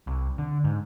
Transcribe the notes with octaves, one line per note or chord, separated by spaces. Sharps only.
C2
D3
G#2